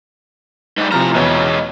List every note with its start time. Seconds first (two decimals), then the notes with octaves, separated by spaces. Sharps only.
0.78 G#2 G3
0.92 A2 C3 F3 A#5 F6
1.15 E2 B2 E3 G#3 C#5